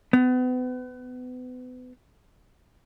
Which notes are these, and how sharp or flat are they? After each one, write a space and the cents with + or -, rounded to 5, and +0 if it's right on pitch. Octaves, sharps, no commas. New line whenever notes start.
B3 +35